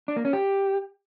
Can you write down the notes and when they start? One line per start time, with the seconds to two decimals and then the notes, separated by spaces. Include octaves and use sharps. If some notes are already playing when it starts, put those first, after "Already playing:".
0.08 D4
0.16 A#3
0.25 C#4
0.33 G4